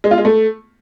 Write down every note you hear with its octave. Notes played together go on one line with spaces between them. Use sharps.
G#3
F4
G#3
A3